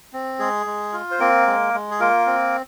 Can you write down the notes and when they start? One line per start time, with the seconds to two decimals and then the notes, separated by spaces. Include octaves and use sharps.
0.13 C4
0.39 G#3 G#4
0.66 G#3
0.93 F4
1.11 C5
1.20 A#3 C4 A#4
1.46 G#3
1.74 G#3
1.91 G#4
2.00 A#3 F4 A#4
2.26 C4